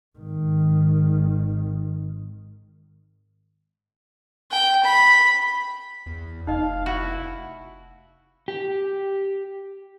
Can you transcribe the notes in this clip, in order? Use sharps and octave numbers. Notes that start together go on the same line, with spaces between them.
G#1 D#3
G5
B5
E2
F1 D#4 D#5 F5
E4 F#4
G4